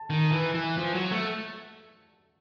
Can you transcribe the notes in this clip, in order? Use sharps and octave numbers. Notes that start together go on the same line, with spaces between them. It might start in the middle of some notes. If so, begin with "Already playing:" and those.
Already playing: A5
D#3
E3
E3
F3
F#3
A3